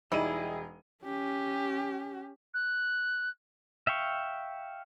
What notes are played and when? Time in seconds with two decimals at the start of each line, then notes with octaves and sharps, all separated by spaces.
0.12 E1 G3 D#4 E4 G#4 D#7
1.05 C#4 G4
2.54 F#6
3.87 E5 F5 G5 C#6